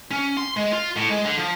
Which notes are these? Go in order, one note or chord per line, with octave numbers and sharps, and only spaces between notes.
C#4
C6
G#3
F4
A2
G#3
D3
F3